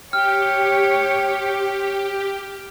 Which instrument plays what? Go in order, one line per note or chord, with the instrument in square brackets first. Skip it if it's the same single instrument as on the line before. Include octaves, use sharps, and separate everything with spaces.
[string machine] G4 [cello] C#5 [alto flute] G5 [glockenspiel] F6